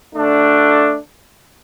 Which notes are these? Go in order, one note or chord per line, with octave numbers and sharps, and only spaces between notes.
D2 D3 A3 D4